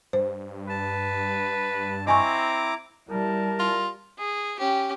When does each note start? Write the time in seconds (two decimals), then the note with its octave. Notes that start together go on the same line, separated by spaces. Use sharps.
0.13 G2 C5
0.69 B4 A5
2.07 C4 E4 D#5 G#5 A#5 C#6 D6
3.10 G3 E4 A#4 A5
3.59 F4
4.18 G#4
4.59 C#4 G4